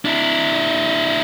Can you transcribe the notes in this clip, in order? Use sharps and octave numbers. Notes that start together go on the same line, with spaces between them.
D4 E4